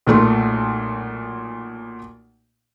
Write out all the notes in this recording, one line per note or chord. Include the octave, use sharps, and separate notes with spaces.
B1 A#2 A3 C6